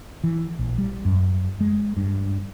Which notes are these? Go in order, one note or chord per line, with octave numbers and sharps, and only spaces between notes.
E3
A#1
G3
F#2
G#3
G2